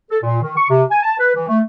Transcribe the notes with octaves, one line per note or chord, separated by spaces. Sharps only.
A4
A#2
D#3
C#6
C3
G#5
A5
B4
E3
A3